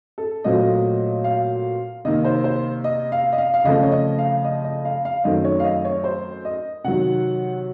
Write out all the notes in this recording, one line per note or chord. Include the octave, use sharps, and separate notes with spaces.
A4
A#2 F#3 A3 C4 D#5
F5
C3 D#3 A#3 D#5
C5
C5
D#5
F5
D#5
F5
F5
C#3 F3 A3 C4 D#5
C#5
D#5
F5
D#5
D#5
F5
F5
F#2 D#3 A3 C4 D#5
C#5
F5
D#5
C#5
C5
D#5
C3 D#3 F#3 F#5